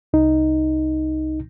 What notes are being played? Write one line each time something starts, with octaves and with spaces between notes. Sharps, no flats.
C2 D#4